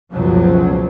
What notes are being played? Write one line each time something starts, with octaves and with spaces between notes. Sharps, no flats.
F#1 C#2 B2 F3 F#3